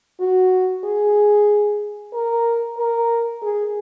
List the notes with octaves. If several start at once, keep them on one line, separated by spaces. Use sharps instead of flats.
F#4
G#4
A#4
A#4
G#4